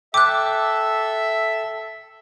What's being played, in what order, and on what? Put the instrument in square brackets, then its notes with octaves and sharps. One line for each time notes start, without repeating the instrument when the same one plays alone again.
[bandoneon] A4 [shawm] E5 [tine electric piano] G5 [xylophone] D6 F#6